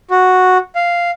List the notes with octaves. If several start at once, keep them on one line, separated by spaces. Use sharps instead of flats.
F#4
F5